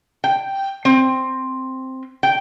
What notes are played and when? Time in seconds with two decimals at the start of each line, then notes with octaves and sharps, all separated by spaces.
0.24 G5
0.85 C4
2.23 G5